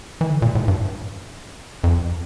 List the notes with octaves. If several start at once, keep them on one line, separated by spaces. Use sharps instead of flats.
E3
D3
A#2
A2
G2
F2